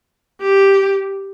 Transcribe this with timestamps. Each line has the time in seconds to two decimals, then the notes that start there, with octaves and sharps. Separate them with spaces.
0.41 G4